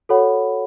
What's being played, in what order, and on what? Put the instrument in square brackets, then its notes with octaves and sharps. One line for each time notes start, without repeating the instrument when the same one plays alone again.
[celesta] F#4 A4 C#5 F#5 B5